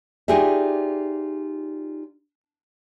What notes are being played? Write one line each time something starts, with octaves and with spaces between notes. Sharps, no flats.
D#4 F4 G4 G#4 D5 E5